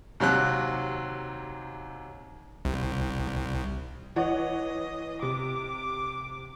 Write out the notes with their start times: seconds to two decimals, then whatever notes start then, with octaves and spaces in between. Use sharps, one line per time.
0.20 D#2 C3 F#3 F#6
2.65 C2
4.16 E3 C#5 D#5 F#5
5.22 C3 D6